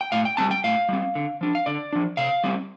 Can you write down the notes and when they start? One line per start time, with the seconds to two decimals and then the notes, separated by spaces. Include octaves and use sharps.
0.01 G5
0.12 A2 F5
0.25 G5
0.37 G3 C4 A5
0.51 G5
0.64 A2 F5
0.89 G3 C4
1.15 D3
1.41 F3 D4
1.55 F5
1.66 D3 D5
1.93 F3 D4
2.17 C3 F5
2.44 G3 C4